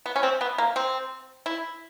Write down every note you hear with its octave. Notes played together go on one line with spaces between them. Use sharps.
B3
C#4
C4
B3
A#3
C4
E4